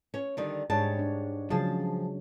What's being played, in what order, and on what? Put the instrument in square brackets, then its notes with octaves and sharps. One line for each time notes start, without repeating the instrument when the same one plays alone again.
[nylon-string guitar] C#4 C#5
D3 D#3 G3
[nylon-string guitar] G#2 G3 A5 [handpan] G#3 D4 C#5
[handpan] D4
[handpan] C#3 F#3 [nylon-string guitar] F3 G#4 A5